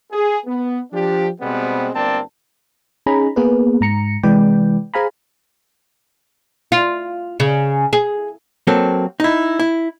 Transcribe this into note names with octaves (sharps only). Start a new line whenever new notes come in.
G#4
B3
F3 D4 G4
B2 G3 G#3 B3 C4
G1 D2 A#3 C4 D5 A5
C#4 D#4 G#4 G#5 A#5 B5
A#3 B3 G#4 A#4 B4
G#2 A#5 C#7
C3 E3 G#3 B4 D5 G5
G#4 C5 F5 G#5 A#5 B5
F4
C#3
G#4
F#3 A#3 C4 A4
D#4 E4
E4